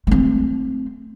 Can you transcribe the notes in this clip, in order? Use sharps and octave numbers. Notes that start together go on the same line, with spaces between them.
A3 C4